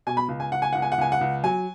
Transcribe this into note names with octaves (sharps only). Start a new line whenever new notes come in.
B2 G#5
B5
C#2
G#5
C#2 F#5
G#5
C#2 F#5
G#5
F#5
C#2 G#5
F#5
C#2
F#3 G#5